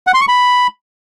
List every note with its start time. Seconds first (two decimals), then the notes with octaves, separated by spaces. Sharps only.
0.07 F#5
0.14 C6
0.21 C#6
0.28 B5